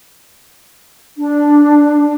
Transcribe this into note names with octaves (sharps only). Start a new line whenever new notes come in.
D4